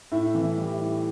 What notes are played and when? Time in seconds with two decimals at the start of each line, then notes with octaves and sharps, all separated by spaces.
0.12 A2 E5
0.35 E3
0.42 E5
0.57 G3
0.73 E5
0.81 A2